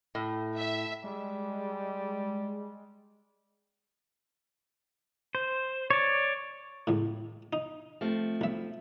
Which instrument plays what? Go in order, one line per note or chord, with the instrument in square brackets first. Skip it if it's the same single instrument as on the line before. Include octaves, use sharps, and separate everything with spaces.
[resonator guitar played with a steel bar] A2
[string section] E5
[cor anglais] G3 [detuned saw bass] G#3
[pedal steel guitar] C5
C#5 D5
[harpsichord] C#2 A2
D#4
[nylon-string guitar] F3 A3 C4
[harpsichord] B1 E5